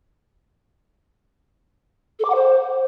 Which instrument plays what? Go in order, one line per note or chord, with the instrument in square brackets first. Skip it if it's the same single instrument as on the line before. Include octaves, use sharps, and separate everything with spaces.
[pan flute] A4
D6
F#5
C5